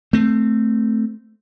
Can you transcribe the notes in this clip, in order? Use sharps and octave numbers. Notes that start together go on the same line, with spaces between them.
A3 C4